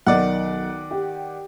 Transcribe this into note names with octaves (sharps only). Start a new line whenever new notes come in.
B1 D#3 D5 F#5
G4